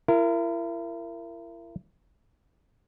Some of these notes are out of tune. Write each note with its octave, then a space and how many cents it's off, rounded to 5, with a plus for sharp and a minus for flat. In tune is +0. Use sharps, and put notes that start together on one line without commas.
E4 +35 A#4 -15